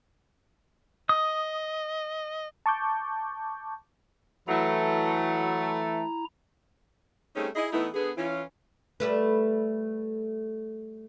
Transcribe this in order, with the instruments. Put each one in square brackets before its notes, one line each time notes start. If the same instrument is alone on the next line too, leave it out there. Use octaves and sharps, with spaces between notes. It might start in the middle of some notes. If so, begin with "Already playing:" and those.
[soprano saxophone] D#5 [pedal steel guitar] D#6
[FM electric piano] A5 C#6 D6 G6
[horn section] E3 A3 [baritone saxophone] F#3 [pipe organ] E4 A#5
[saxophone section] G3 A3 C4 C#4 D#4 G#4
E4 G#4 D#5
E3 A3 B3 D#4 E4
D3 B3 G#4
E3 C#4 F4
[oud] G3 A3 B4